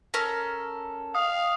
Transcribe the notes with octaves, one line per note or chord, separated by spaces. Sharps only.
C#4 A4 A#4
F5 D#6